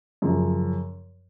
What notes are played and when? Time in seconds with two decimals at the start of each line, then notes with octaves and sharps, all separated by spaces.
0.22 F#2 C#3 F3